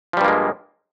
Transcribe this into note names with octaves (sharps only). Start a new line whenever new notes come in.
G2 F3 G3 G#3 A#3